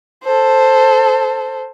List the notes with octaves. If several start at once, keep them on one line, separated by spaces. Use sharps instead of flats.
A4 C5